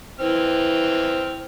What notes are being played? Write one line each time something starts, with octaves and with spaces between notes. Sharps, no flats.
E3 C4 F6